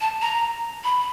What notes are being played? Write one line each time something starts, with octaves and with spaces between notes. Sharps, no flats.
A5
A#5
B5